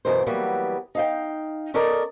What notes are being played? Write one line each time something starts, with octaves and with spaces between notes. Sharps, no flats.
F#2 B2 E3 A#4 C5
E3 F#3 G3 A#3 B3
D#4 F5 G5
C#4 A4 A#4 D5 D#5